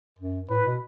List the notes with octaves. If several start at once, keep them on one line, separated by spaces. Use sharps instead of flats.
F#2
A2 B4
B2